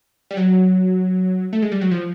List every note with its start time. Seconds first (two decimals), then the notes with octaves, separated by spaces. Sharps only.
0.31 G3
0.37 F#3
1.53 A3
1.62 G#3
1.72 G3
1.81 F#3
1.91 F3